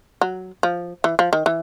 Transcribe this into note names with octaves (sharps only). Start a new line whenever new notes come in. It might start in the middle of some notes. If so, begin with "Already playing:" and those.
F#3
F3
E3
F3
D#3
E3